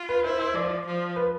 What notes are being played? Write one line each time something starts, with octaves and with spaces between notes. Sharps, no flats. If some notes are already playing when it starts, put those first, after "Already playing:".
Already playing: F4
B4
E4 C5
C5
F3 D5
F3
B4